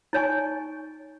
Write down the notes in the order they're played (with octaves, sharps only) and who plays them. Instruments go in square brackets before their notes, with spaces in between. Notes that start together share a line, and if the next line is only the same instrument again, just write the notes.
[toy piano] D#4 C#5 G#5 C#6